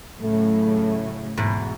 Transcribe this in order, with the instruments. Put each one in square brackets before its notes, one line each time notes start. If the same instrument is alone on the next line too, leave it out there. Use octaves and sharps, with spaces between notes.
[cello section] A2 C#3 F#3 [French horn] A3
[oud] E2 G#2 B2